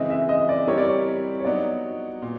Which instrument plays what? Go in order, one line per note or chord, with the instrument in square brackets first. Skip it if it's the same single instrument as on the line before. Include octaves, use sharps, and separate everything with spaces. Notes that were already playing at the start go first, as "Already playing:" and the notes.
Already playing: [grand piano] C#3 E3 G#3 C4 [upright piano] D#5 E5
[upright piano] E5
D#5
D5
[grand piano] G3 C4 E4 G4 A#4 [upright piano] C#5
[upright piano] D5
C#5
C#5
[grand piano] F#3 B3 D#4 [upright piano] D5
[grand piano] A#2